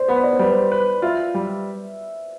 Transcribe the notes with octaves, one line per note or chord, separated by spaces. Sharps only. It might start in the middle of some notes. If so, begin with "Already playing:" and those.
Already playing: C5 D5
B3 B4
D5
C5
G3 B4
C5
B4
F4 E5
G3